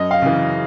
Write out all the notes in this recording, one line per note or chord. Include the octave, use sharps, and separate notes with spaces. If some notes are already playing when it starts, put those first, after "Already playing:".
Already playing: F#2 D#5
F5
C#3 E3